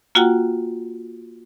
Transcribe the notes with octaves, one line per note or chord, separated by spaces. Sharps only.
A#3 F4 F#4 F#5 G5 A#5